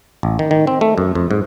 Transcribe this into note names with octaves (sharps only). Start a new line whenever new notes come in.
A1
D#3
D#3
C4
A3
F#2
F2
G#2